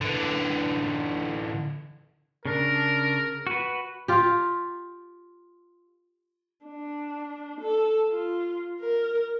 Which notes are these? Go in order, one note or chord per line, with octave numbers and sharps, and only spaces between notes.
D3 E3
C#3 D4 A#4
F#4 B4
F4 G4
D4
A4
F4
A#4